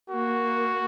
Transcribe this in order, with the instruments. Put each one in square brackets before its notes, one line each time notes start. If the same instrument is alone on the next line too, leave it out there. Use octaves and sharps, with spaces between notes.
[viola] A#3 [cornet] F#4